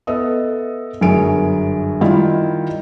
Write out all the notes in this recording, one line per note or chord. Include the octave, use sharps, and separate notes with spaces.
B3 A4 D#5 E5 D#6
G1 F#2 G#4 A#4 G#5 D7
D#3 G3 E4 F4